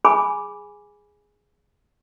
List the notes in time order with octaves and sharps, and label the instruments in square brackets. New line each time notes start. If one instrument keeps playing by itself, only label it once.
[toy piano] G#4 G#5 B5 D6